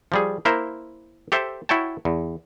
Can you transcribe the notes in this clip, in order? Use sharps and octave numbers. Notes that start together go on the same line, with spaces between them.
F3 G3 G#4
A#3 E4 A#4 C5
G4 A4 C5 E5
E4 F#4 C#5 G5 A5
E2